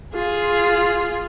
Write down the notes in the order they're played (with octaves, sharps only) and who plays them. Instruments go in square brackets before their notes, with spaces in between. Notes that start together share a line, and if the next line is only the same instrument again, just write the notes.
[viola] F4 G#4